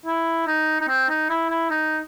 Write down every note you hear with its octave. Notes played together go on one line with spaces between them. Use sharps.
E4
D#4
D#4
C4
D#4
E4
E4
D#4